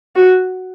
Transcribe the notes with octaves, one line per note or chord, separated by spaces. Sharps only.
F#4